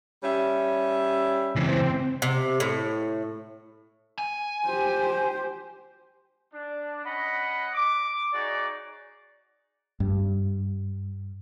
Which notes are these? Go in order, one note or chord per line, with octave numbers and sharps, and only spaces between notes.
G3 C#4 E5
C#2 E3 C4
C3
A2
G#5
G4 C5
D4
C#4 D#5 F#5 B5
D6
D#4 F#4 G#4 C#5 D5
G2